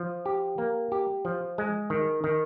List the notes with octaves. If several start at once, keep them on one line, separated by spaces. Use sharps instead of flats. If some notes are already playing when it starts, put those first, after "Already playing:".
Already playing: F3
G4
A#3
G4
F3
G#3
D#3
D#3